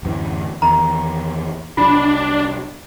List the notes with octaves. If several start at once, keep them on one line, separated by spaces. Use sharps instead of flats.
D1 F#2 E3
E2 D#3 A#5
C2 F#3 D4 F4